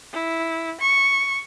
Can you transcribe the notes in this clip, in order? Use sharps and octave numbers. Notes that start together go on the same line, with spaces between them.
E4
C#6